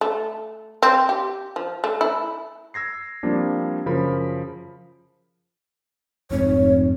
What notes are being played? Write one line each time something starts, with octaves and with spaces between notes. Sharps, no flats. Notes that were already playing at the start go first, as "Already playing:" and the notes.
A3
C4
G4
F3
A3
E4
E6 G#6 A#6 C7
F3 G3 A#3 C4 D4
F#2 C#3 F3 A#4 B5
F1 F2 G#2 C#5